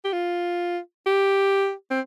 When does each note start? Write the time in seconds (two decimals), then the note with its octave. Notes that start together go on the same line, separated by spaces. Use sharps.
0.04 G4
0.12 F4
1.06 G4
1.91 C4